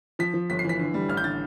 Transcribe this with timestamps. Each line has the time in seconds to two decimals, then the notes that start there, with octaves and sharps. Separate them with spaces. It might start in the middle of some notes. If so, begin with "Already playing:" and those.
0.19 F3 B6
0.34 F3
0.50 G1 B6
0.59 C7
0.64 E3 B6
0.79 D3
0.94 G3
1.09 A1 F6
1.17 G6
1.24 D3 A6